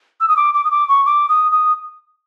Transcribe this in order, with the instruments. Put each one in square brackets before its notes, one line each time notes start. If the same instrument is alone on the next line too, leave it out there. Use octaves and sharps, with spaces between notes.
[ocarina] E6
D#6
D6
D6
D#6
D6
C#6
D6
D#6
D#6